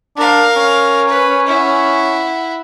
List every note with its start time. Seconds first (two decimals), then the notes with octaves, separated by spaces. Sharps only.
0.17 D4 A#4 F5
0.57 C#4
1.08 B4
1.47 E4 F#5